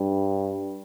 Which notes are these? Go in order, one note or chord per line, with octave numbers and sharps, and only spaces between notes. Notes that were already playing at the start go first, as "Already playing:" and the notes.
Already playing: G2